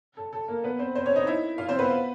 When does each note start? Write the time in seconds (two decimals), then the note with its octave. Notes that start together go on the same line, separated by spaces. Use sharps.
0.17 A4
0.33 A4
0.48 A#3 A#4
0.64 B3 B4
0.79 C4 C5
0.95 C4 C5
1.06 C#4 C#5
1.16 D#4 D#5
1.27 E4 E5
1.58 F4 F5
1.69 C4 C5
1.79 B3 B4